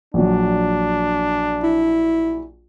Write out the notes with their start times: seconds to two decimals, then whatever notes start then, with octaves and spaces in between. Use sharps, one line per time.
0.14 A#1 F#3 D4
1.64 E4